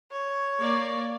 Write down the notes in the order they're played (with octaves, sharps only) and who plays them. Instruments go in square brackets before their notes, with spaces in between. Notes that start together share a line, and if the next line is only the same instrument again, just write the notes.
[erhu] C#5
[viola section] A#3 D5